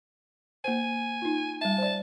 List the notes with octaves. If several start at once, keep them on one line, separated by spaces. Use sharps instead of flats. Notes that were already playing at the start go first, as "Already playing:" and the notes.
A#3 C5 G#5
D#4 F4
G3 E5 A5
C5 D5